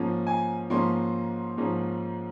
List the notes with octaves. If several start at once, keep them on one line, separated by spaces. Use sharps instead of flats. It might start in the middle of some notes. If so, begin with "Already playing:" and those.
Already playing: G#2 F3 A#3 C#4
G#5
G#2 F3 A#3 C#4 C6
G#2 F3 A#3 C#4